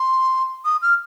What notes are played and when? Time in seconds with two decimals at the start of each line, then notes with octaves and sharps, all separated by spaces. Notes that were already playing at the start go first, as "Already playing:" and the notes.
Already playing: C6
0.65 D#6
0.82 F6